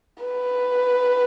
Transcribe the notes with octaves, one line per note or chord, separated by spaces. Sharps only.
B4